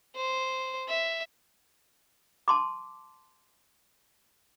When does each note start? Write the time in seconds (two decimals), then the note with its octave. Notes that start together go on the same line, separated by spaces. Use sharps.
0.16 C5
0.89 E5
2.48 A5 C6 D6